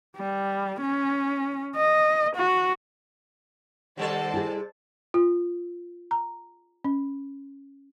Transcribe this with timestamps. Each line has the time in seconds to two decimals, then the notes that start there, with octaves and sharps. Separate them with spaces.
0.17 G3
0.81 C#4
1.76 D#5
2.36 F#4
3.97 C3 D#3 G3 A4 C5 D5 F#5 A5
4.34 E4 G#4
5.14 F4
6.11 A#5
6.84 C#4